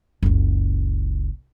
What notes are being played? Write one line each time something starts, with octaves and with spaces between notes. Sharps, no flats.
F#1 C#2